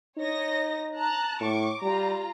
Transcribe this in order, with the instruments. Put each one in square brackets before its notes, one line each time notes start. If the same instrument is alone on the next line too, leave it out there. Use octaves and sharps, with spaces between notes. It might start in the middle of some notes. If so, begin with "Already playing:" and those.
[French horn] D#4 [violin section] C#5 D#5 A#6
[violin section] A5 A#5 F#6
[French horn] A2 [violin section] C#6 D6
[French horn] G3 [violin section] F4 A#5